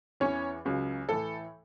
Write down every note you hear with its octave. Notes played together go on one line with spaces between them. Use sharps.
E2 E3 C#4 C#5
C#2 C#3 F#3
A2 E3 A4